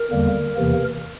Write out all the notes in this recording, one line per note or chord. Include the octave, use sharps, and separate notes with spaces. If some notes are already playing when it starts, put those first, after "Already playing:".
Already playing: A#4
E2 D3 G3 A#3
E2 C3 E3 A#3